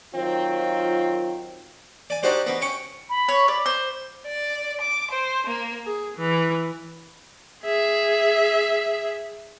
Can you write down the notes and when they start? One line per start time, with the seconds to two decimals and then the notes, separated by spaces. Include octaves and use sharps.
0.15 D#3 F#3 C4 F4
2.10 D5 G#5
2.23 D4 D#4 F#4 G4 C5 D5
2.46 B2 B3
2.61 C#4 G5 C#6
3.09 B5
3.28 C#5
3.48 D5
3.66 C5
4.25 D5
4.80 D6
5.10 C5
5.45 A#3
5.85 G#4
6.17 E3
7.64 G#4 E5